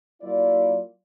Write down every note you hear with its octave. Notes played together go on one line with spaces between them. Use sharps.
F#3 A#3 E4 F4 D5